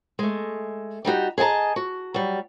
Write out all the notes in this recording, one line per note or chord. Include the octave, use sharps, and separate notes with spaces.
G#3 A3
G3 D#4 F#4 G4
G#4 D#5 F#5 A5 A#5
F#4
F#3 G3